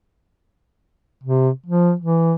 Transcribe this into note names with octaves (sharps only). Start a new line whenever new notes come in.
C3
F3
E3